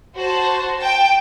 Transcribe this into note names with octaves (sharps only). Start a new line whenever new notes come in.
F#4 C5 A5
G5 A5